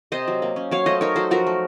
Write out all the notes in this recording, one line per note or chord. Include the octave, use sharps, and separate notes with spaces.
C3 C5 D#5
F#3
A#3
C#4
F#3 C#5 F5
A3 C5 D#5
D#4 A#4 C#5
F#3 A4 C5
F3 F#4 A#4
A3